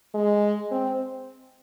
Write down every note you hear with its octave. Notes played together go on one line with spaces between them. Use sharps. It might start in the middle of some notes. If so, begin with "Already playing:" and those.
G#3
C4